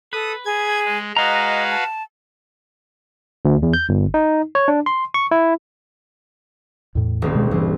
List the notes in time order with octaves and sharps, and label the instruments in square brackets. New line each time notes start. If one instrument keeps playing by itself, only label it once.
[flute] A4 [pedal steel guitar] B4 [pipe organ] D#6
[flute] G#4 [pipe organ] G#6
[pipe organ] G#3
[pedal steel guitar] G#3 A#5 [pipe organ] F#4 B4 F5 [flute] D#5
[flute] A5
[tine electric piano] D2
E2
G6
G1
D#4
C#5
D4
C6
C#6
E4
[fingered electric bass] E2 A2
[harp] D#1 C#2 C4
[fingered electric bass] B2 G#3
[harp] C2 [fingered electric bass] G2 E3